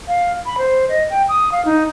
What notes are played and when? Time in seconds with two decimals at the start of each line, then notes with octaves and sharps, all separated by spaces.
0.08 F5
0.46 B5
0.58 C5
0.89 D#5
1.10 G5
1.29 D#6
1.52 F5
1.65 D#4